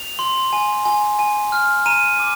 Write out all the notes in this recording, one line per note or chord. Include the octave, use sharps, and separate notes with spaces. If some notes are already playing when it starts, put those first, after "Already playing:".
Already playing: F7
C6
G#5
G#5
G#5
F6
A#5 D#7
D6